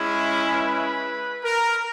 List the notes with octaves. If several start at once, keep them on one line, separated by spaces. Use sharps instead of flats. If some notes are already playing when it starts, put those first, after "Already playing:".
Already playing: G#3 C#4 E4
B4
A#4